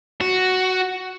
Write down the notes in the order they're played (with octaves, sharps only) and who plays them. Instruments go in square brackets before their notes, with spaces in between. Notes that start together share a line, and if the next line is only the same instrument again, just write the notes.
[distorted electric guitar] F#4